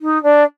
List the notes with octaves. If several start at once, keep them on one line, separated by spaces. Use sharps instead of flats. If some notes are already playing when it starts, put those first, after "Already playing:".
D#4
D4